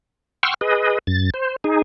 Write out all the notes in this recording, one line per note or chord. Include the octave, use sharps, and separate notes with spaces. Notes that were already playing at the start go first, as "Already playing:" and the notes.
F#5 G5 C6 C#6 E6 F6
G#4 B4 D#5
F#2 A6
C5
D#4 G#4